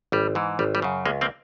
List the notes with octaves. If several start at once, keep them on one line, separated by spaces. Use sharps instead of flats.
G#1 G3
G#2 E3
G#1 G3
G3
F#2 C#3
C#2 G#3 A#3
A#3 C4